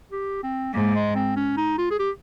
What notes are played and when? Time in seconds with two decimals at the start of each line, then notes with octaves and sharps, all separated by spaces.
0.11 G4
0.43 C4
0.74 G#2 A#3
0.96 G#3
1.16 C4
1.37 C#4
1.57 D#4
1.78 F4
1.91 G#4
1.99 G4